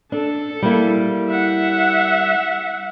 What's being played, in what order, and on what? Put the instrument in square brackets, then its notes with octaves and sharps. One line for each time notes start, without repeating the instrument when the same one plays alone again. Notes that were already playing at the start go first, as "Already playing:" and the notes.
[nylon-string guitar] D4 [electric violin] A4
[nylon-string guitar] G3 A#3 E4
[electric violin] E5 F#5